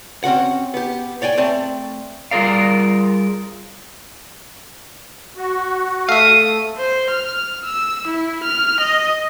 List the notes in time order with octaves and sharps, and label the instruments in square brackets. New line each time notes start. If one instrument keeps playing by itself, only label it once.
[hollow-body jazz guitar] C4 C#4 F#4 F#5
B3 G4
C#5 D5 G5 G#5
A3 C4 D5 A5
[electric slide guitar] G3 F4 G#4 A#4 D5 F5
[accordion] F#4
[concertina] A3 A4 [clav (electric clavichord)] E5 F5 [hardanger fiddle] D#6
[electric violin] C5
F6
E6
E4
F6
D#5